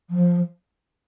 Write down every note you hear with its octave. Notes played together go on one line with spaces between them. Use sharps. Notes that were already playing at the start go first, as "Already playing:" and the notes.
F3